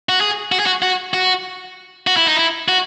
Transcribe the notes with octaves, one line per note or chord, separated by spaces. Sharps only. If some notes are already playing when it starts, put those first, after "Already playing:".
F#4
G#4
F#4
G#4
F#4
F#4
F#4
F#4
E4
D#4
E4
F#4